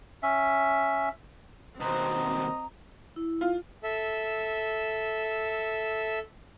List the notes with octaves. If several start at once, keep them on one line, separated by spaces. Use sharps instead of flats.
C#4 E5
D#2 B2 C4 D#5 A#5
E4
F4
A4 E5